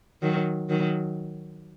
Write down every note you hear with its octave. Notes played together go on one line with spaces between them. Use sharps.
D#3 F#3
D#3 F#3